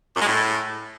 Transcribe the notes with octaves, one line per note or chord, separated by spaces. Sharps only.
F#2
G#3
A2